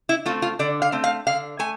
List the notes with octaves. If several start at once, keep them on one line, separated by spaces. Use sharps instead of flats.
E4
A3 C4 F4
F4
D3 D5
F5
A3 C4
F5
D3 F5
A3 G#5